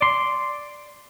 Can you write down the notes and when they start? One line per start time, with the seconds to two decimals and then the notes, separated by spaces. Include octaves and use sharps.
0.01 D5 C6